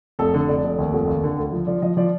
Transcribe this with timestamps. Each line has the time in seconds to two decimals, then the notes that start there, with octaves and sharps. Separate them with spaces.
0.19 F1 A4
0.34 D3
0.48 F1 D5
0.64 F1
0.78 D#2
0.93 F1
1.08 D#2
1.23 D3
1.37 D2
1.52 F3
1.67 F3 D5
1.82 F3 D#5
1.97 F3 D5